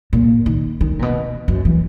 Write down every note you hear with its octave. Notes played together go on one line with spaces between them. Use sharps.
A#2
D#3
D#3
A#2
B2
F#2
E3